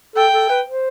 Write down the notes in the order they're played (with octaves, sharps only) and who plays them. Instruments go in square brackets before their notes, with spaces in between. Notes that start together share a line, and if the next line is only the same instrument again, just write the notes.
[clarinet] A4 [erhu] G5
[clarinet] A4
B4
C5